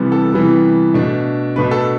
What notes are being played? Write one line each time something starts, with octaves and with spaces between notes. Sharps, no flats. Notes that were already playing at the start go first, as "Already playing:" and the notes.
Already playing: C3 E3 G3 B3
A4
C3 E3 G3 B3
B2 A3 D4
B2 A3 D4 B4
A4